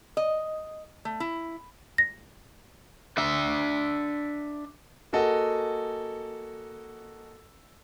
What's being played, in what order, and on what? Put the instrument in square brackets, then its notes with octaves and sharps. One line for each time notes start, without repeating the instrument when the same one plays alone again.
[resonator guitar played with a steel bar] D#5
A3
E4
[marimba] A#6
[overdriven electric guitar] D4 E5
[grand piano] A#3 F#4 G#4 A4 D#5 F#5